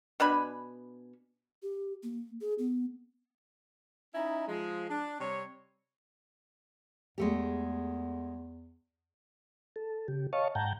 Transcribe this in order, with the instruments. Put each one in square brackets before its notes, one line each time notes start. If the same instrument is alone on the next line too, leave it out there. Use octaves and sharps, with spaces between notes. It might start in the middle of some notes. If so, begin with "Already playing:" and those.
[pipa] B2 D4 G#5 B5
[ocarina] G4
A#3
G#4
B3
[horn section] C#4 D#4 E4 A#5 B5
F3 G#3
D4
C3 G3 C#5
[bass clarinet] E2 [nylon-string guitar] G#3 A3 G4
[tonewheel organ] A4
C#3 G4
C#5 D#5 F5 A5 C#6
G#2 F#5 G5 A5 A#5 G6